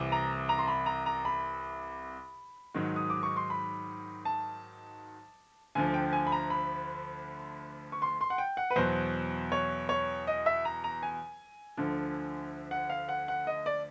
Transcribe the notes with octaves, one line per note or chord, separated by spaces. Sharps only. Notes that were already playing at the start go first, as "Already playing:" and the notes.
Already playing: C2 C3 E3
A#5
A#5
C6
B5
A#5
A#5
B5
G#2 D#3 F#3
D#6
D6
C#6
C6
B5
A5
D2 D3 F3 G#5
G5
G#5
B5
A#5
B5
C#6
C6
C6
F#5
G5
F#5
B4
E2 B2 F#3 C5
C#5
C#5
D#5
E5
A#5
A#5
G#5
D2 D3 F3
F#5
F5
F#5
F#5
D#5
D5